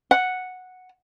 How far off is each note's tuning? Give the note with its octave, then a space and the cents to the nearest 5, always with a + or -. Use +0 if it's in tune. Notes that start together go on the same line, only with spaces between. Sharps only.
F#5 -5